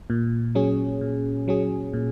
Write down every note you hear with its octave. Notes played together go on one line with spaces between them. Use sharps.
A#2
F#3 C#4 G#4
A#2
F#3 C#4 G#4
A#2